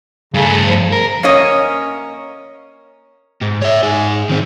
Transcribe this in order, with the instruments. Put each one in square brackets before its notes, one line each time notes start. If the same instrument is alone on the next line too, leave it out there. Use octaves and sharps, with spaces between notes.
[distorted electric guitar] G2 A3 [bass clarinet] C#3
[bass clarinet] F3
[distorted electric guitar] A#4
[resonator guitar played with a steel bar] A#3 C#4 C#5 D#5
[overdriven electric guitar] G#2
C#5 E5
G#2 G#4
D#3 C4